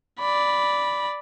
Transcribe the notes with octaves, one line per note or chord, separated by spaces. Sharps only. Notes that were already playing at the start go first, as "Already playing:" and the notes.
D5 B5